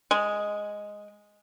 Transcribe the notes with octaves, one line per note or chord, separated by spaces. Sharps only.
G#3